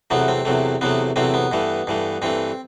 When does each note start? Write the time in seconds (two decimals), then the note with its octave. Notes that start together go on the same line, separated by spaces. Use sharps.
0.10 E2 C3 F#3 A3 B3
0.28 C4
0.45 E2 C3 F#3 A3
0.81 E2 C3 F#3 A3 B3
1.16 E2 C3 F#3 A3 C4
1.34 B3
1.51 G2 E3 A3
1.87 G2 E3 A3
2.22 G2 E3 A3 C4